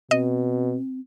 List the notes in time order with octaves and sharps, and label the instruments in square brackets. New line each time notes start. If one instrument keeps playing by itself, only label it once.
[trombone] B2 [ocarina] C4 [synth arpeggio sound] D#5